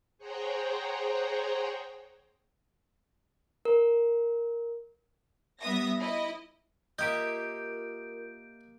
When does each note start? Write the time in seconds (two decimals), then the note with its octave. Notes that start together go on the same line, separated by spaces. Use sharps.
0.18 G#4 C5 C#5 F#5 G5 A#5
3.65 A#4
5.60 G3 B3 E5 D#6 A#6
5.99 E4 D#5
6.99 A#3 F4 G4 A#4 D#5 E5 G6 D7